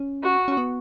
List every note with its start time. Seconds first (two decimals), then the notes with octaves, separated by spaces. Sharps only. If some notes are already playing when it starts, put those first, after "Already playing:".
Already playing: C#4
0.23 F#4
0.48 C#4
0.57 B3